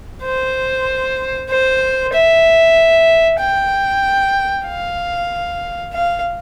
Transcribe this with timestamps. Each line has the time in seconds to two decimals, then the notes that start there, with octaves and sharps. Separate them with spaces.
0.23 C5
1.50 C5
2.13 E5
3.40 G5
4.66 F5
5.93 F5